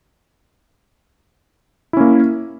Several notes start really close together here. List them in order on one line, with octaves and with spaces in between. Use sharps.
E4 C#4 A#3